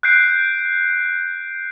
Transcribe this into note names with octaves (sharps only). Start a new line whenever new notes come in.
F#6 G6 C7 D7